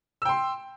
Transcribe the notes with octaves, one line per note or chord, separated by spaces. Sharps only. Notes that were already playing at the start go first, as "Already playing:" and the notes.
G5 C6 E6